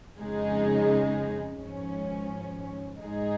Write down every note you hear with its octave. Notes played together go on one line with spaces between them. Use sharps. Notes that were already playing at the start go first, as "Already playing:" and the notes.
F2 C#3 G#3 D#4 G#4
G#1 G#2 F3 C#4
G#2 G#3 D#4 G#4